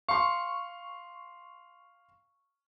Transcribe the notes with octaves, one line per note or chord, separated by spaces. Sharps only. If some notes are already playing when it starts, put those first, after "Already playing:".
F5 C6 C#6